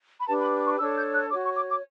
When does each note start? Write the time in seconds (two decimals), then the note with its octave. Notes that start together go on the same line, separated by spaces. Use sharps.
0.19 B5
0.28 D4 G4 B4 A5
0.40 B5
0.66 C#6
0.79 D4 A4 C#5 E6
0.96 G6
1.13 F#6
1.30 C#5 D6
1.35 F#4
1.44 C#6
1.57 D6
1.70 D6